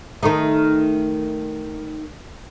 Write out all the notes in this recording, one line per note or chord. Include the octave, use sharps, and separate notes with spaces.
D#3 A3 D#4